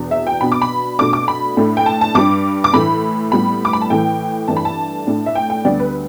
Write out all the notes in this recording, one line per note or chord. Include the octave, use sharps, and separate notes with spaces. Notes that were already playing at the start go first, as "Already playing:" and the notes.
Already playing: E2 B2 B3 D4
E5
G5
B2 B3 D4 B5
D6
B5
B2 A3 D4 D6
D6
B5
A2 A3 D4
G5
A5
A5
G2 G3 D4 D6
D6
A2 E3 A3 B5
A2 G3 B3 B5
D6
B5
A5
A2 E3 A3 G5
G2 E3 A3 D4 A5
B5
A5
A2 A3 D4
E5
G5
G5
D2 D3 G3 B3 D4 D5
B4